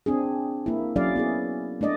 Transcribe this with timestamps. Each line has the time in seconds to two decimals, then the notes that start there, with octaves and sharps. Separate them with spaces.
0.06 C4 D4 G#4
0.66 A#3 E4
0.96 F#3 C#4 E4 G#4 D5 F5
1.16 B3 E4 G#4
1.81 A3 D4 D5 D#5